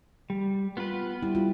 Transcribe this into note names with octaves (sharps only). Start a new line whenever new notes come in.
G3
B3 F4 B4
G3 E4
F4